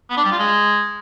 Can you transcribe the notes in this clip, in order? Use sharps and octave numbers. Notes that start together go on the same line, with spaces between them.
B3
D4
G3
F4
G#3